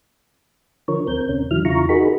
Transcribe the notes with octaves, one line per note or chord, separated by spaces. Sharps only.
D3 F3 A#4 C#5
D2 C4 A#4 G6
D#2 C3 C#4
E2 D3 E3 F#3 E4 F6
E2 C#3 E4 F4 A#5 C#6
D#4 F#4 G#4 A#4 B5